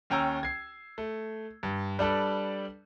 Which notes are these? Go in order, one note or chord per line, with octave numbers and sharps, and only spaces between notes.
D#2 C#4 G5 A#5 E6
G#6 C7
A3
G2
G3 D4 A4 B4